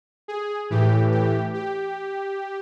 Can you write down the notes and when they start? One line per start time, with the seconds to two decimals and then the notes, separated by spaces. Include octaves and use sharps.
0.28 G#4
0.70 A2 E3 G4
1.12 G4
1.54 G4